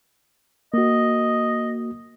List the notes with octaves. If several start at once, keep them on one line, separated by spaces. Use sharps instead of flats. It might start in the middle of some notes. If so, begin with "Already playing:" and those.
A#3 F#4 D#5